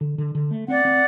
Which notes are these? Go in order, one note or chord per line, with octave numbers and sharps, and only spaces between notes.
D3
D3
D3
A3
C4 D5 F#5
C4